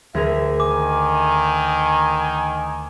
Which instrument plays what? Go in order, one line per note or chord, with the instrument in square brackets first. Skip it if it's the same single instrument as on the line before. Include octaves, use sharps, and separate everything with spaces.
[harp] D2 G#4 A#4 [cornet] E5
[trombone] D#3 [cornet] G#5 [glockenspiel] D6